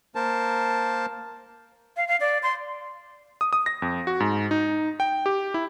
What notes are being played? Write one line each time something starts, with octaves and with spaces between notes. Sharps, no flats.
A#3 A#4 C5 A5
F5
F5
D5
C6
D#6
D#6
A#6
F2
F#4
G#2
D#4
G5
G4
E4